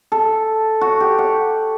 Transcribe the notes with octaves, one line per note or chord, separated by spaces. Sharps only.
A4
F#4
G4
F#5